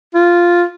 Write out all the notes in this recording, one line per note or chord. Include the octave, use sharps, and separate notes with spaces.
F4